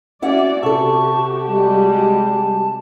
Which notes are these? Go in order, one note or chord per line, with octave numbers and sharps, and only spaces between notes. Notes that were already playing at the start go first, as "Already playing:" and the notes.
C#4 E4 F#4 D5 F#5
C3 F#4 G4 A4 A5 C#6
G3 G#3 A5